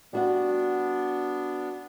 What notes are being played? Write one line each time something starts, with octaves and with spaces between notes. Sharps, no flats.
G3 B3 D4 F#4 F#5